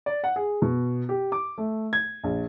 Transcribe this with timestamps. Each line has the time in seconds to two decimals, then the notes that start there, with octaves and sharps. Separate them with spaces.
0.06 D5
0.24 F#5
0.36 G#4
0.62 B2
1.09 G4
1.32 D6
1.58 A3
1.93 G#6
2.24 A#1